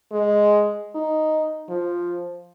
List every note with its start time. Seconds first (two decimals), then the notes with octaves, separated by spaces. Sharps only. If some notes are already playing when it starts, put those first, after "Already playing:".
0.12 G#3
0.95 D#4
1.69 F3